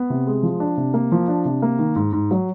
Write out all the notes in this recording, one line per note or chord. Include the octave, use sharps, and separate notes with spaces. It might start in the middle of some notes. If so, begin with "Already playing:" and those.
Already playing: B3
C3
G#3
F3
D4
C3
A#3
F3
D4
C3
A#3
D#3
G#2
G#2
F#3